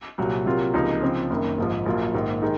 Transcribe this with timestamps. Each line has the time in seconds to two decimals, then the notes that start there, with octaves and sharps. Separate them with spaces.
0.18 C2 A#2 F#3
0.46 C3 F#3 A#3 F4
0.74 C#2 C3 F3 A#3 D#4
1.02 C#3 F3 C4
1.30 F#1 F#2 D#3
1.58 A#1 G#2 F3
1.86 A#1 A#2 F#3 A#3 F4
2.14 A#1 G#2 D#3
2.42 D#3 G#3 D#4